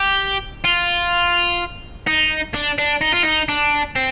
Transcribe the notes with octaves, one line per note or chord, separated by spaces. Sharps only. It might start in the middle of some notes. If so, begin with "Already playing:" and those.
Already playing: G4
F4
D#4
D4
D4
D#4
F4
D#4
D4
C4